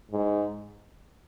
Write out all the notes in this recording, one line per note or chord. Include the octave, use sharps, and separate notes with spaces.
G#2